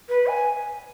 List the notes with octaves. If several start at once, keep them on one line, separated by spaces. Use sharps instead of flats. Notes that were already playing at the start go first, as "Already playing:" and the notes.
B4
G#5